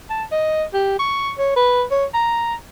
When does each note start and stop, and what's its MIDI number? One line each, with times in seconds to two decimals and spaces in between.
0.10 0.24 81
0.32 0.64 75
0.74 0.98 67
0.99 1.32 85
1.38 1.52 73
1.56 1.84 71
1.91 2.05 73
2.14 2.55 82